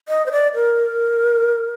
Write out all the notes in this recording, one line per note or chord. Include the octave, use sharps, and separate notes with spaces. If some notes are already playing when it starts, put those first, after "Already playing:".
D#5
C5
D5
A#4